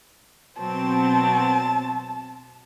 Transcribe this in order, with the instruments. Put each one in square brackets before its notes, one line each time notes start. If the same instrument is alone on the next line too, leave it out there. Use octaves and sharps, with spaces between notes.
[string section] B2 F#3 C4 [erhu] A5